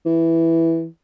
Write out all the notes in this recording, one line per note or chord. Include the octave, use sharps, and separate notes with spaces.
E3